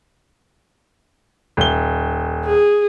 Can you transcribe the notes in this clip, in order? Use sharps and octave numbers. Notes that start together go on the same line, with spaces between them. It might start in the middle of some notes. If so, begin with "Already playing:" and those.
D#1 G7
G#4